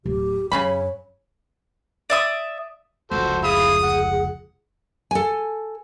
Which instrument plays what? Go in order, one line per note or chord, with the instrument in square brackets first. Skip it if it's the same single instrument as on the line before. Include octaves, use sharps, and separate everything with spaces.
[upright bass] D1 [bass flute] G4
[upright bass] F#2 [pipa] C#3 C#4 B5 [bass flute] C#5
[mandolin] D5 E5 D#6
[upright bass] F1 C#2 [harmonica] F#4 A4 C5
[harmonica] E4 F5 B5 [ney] G#4 [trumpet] D#6
[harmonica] F#5
[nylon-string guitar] A4 G#5